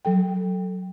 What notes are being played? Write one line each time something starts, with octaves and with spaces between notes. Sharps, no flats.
F#3 A4 G5